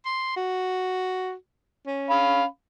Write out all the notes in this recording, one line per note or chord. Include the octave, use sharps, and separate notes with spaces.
C6
F#4
C#4
F5 B5